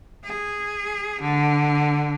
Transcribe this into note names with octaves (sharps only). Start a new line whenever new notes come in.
G#4
D3